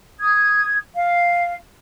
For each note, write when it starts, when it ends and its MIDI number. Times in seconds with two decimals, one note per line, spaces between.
0.20 0.78 87
0.20 0.78 92
0.95 1.54 77